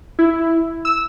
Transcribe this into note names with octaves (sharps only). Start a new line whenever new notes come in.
E4
E6